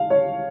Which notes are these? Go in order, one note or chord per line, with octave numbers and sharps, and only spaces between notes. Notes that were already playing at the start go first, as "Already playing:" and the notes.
Already playing: F5
C#5